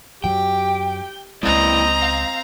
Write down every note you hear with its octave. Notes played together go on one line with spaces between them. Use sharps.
F#2 F#3 G4 G5
C#2 G#3 A#3 C4 E4 D5 D#5 A#5
F5